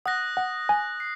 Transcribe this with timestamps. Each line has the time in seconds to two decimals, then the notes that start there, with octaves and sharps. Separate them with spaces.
0.06 F#5 D#6 F#6 A#6
0.37 F#5
0.69 G#5
1.00 C7